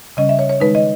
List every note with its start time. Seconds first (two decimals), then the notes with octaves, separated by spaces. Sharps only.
0.17 C#3 G3 C#4 D#5
0.29 E5
0.39 C#5
0.49 C#5
0.60 D#3 G#3 D#4 B4
0.75 D#5